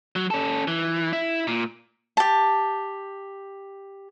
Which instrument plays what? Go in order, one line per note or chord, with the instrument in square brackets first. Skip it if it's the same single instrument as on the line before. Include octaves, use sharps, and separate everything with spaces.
[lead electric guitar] F#3
C#4 A4
E3
E4
A#2
[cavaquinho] G4 A5